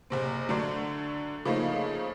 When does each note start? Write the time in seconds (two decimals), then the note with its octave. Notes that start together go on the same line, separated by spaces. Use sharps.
0.10 F#1 C3 C4
0.49 D3 F#3 A3 D4
1.45 C#3 F3 A3 A#3 D#4